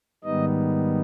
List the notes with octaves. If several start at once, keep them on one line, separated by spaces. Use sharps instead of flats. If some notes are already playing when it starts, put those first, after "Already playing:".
G#2 D#3 G3 B3 D#4 D#5